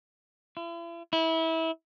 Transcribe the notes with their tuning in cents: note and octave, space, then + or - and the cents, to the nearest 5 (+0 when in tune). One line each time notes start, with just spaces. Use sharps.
E4 +45
E4 -25